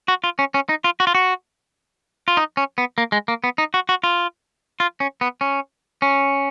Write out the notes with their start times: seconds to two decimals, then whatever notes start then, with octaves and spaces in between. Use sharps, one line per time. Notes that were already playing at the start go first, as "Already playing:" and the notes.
0.08 F#4
0.24 F4
0.39 C#4
0.54 C#4
0.69 D#4
0.84 F4
1.00 F#4
1.07 F4
1.15 F#4
2.28 F4
2.37 D#4
2.57 C#4
2.78 B3
2.98 A#3
3.12 G#3
3.28 A#3
3.44 B3
3.58 D#4
3.74 F#4
3.89 F#4
4.04 F4
4.80 F4
5.00 C#4
5.21 B3
5.41 C#4
6.02 C#4